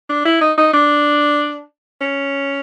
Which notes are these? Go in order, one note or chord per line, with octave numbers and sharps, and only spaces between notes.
D4
E4
D#4
D#4
D4
C#4